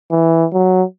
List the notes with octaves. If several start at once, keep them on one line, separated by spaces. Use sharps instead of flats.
E3
F#3